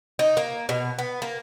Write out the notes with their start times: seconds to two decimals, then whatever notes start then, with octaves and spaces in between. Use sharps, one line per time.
0.19 D#4
0.37 A#3
0.69 B2
0.99 B3
1.22 A#3